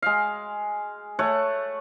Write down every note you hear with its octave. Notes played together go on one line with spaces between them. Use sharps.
G#3 F5
A3 C#5 F#5